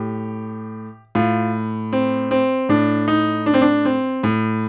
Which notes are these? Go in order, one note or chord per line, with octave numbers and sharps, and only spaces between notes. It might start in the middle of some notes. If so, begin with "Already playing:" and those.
Already playing: A2 G4
A2 F4
C4
C4
A2 D4
D#4
D4
C4
D4
C4
A2